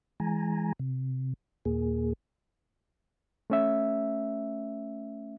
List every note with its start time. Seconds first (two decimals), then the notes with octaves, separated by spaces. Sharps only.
0.20 E3 G#3 G#5 A#5
0.79 C3
1.65 D#2 A#2 A#3 G#4
3.50 A3 C#4 E5